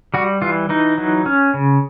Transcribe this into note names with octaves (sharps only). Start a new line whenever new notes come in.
G3 F#4
E3 F4
E3 D#4
F#3
C#4
C#3